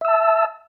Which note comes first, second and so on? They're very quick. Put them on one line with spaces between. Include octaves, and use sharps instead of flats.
E5 E6 A5